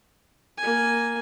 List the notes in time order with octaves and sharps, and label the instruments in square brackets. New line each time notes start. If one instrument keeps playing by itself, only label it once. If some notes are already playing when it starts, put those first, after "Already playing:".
[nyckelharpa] A#3 G#5